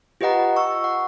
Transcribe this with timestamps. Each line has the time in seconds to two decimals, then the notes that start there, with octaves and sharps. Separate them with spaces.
0.21 F4 G4 B4 D#5 F#5 A#5
0.56 C#6 E6
0.84 F#5